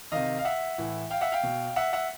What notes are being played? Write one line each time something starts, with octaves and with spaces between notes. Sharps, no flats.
C3 D#3 D#5 F5
F5
E5 F#5
A2 E3
F5 G5
E5 F#5
F5 G5
B2
E5 F#5
E5 F#5